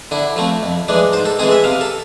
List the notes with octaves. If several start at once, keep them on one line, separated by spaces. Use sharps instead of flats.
D3 E4
F3 A3 C4
F2
E3 G#3 D4
G#2 C5
A4
E3 G#3 C4 G#4
E5
C3 F5
A4